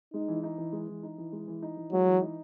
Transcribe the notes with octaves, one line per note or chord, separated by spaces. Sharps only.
G#3 D#4
E3
D#4
E3
G#3
E3
D#4
E3
G#3
E3
D#4
E3
F#3 G#3
E3
D#4